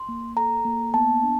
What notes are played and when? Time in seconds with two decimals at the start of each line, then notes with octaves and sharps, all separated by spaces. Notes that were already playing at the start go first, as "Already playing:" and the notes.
Already playing: C6
0.08 A#3
0.37 A4 A#5
0.65 A#3
0.94 B3 A5
1.23 D4